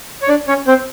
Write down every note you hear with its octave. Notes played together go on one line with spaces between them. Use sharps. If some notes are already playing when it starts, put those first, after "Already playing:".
C#5
D4 D5
C#4 C#5
C4 C5